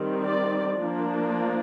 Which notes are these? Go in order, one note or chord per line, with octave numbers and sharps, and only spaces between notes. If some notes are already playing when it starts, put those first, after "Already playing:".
Already playing: D#3 G3 C4
D5
F3 A#3 D4